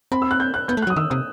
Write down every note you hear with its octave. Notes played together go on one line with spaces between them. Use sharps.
C4 B5
E6
F#6
G6
F#6
B3 G6
A3
F#3 F#6
D#6
D#3 E6
C3 D#6